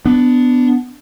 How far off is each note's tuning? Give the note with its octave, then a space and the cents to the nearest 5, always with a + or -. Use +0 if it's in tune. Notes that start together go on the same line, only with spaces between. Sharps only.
B3 +15 D4 +5